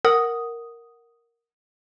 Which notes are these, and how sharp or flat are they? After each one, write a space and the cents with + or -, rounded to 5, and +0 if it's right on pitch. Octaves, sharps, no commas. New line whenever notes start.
A#4 +0 F#5 +0 D#6 +0